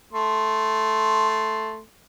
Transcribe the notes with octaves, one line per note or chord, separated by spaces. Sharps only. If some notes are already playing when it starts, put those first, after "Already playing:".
A3 C6